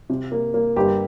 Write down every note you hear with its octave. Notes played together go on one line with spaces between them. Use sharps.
C3
A#3
A#3
G1 G4